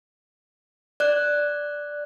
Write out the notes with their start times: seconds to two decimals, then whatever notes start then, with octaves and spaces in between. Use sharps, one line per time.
1.00 D5 F#6